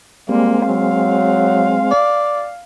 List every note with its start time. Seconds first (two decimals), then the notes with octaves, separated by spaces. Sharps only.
0.29 G3 G#3 A#3 C4
0.68 F#3 F5
1.91 D5